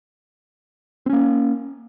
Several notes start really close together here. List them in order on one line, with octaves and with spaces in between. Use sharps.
C4 C#4 A#3